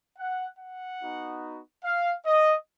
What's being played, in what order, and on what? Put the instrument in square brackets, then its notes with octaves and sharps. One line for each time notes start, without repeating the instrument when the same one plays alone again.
[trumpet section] F#5
F#5
B3 D#4 F#4
F5
D#5